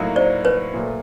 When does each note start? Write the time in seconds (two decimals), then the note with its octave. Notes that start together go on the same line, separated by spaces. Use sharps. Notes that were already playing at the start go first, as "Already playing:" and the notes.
Already playing: A2 F#3 A#3 D#4 F#4
0.16 C5 D5
0.45 B4 C#5
0.74 A#2 F#3 A3